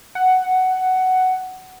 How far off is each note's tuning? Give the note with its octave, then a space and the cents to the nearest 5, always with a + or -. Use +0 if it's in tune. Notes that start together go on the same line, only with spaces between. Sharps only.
F#5 +10